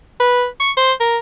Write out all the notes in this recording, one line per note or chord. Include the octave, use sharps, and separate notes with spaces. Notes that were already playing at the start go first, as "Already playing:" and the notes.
B4
C#6
C5
A#4